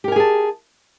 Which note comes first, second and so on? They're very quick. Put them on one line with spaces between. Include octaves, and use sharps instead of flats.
G4 A#4 G#5 G#4 A5